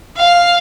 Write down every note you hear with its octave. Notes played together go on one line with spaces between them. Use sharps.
F5